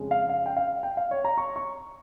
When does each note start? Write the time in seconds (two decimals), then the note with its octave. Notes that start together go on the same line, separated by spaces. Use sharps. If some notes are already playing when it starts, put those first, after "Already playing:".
Already playing: F2 C#3 G#3
0.11 F5
0.29 F5
0.46 G5
0.57 F5
0.83 G5
0.97 F5
1.11 C#5
1.24 A#5
1.37 C#6
1.56 C#6